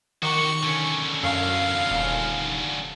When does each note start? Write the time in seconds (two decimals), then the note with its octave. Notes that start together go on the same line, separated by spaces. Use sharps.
0.23 D#3 F#4 G4 C#6
0.63 D3 C#4
1.23 F#2 F5
1.91 D#1